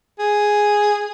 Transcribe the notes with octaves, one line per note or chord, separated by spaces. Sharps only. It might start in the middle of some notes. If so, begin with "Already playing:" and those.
G#4